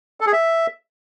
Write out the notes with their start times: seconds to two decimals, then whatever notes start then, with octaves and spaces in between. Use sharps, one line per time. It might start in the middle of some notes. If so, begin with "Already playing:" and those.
0.20 A4
0.27 G#4
0.33 E5